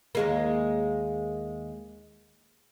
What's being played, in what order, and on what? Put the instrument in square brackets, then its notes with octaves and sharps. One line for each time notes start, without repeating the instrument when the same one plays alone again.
[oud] D#2 G#3 A#3